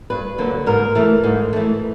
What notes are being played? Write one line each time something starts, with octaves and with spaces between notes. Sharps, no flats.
G2 B4
D3 F#3 A#3
G#2 A#4
E3 A3
G#2
E3 A3